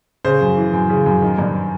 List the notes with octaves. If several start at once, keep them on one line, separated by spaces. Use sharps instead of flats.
C#3 C5
F#2
E3
F#2
C#3
F#2
D#3
G2